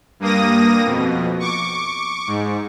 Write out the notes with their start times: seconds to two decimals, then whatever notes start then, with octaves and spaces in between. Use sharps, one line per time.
0.20 G2 A#3 D#6 A#6
0.85 F2 B2
1.39 C#6 D6
2.27 G#2